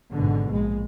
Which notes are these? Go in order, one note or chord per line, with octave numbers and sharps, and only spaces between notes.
G#1 G#2 B2 D3
A#1 G#3